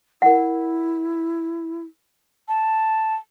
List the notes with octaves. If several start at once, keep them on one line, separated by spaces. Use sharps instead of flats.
E4 A#4 F#5
A5